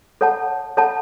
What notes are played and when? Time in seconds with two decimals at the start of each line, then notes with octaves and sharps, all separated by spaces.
0.21 A4 C#5 F#5 A5
0.77 A4 C#5 F#5 A5